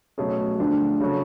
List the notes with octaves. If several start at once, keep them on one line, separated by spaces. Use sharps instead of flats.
B2 F#3 A3 C#4 G#4
D3 F3 A3 D4
C#3 F#3 C#4 F#4 A4